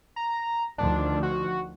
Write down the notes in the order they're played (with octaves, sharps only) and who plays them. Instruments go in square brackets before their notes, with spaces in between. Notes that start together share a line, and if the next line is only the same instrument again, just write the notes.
[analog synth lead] A#5
[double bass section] D2 D#3 F3 [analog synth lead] D4
[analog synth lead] F#4